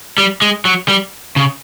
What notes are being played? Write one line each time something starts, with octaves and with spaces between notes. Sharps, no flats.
G3
G#3
F#3
G3
C#3